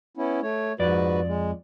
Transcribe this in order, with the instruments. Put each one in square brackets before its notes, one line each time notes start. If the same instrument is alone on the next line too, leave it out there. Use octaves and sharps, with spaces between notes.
[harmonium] B3 C#4 E4
A3 C#5
[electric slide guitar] F2 D5 [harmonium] G#2 F#4 B4
[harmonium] G#3